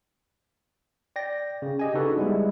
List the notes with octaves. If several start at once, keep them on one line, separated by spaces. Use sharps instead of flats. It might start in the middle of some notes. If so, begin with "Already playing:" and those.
D5 G5 A#6
C#3
G4 D#5 G#5
C#3 D4 D#4 F#4 A4 B4
G3 G#3 B3 E4